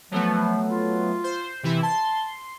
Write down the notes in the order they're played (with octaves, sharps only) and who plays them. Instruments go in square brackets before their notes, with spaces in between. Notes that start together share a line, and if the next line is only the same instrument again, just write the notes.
[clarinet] F3 [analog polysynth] F#3 A3 B3
[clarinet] F4
[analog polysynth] C5
C3 E3 E4
[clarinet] A5 [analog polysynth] C6